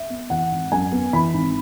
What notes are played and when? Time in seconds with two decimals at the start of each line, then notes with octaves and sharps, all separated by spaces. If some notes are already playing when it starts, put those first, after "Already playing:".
Already playing: E5
0.10 B3
0.30 E3 F#5
0.51 G#1
0.72 F#2 G#5
0.92 B3
1.13 E3 B5
1.34 G#1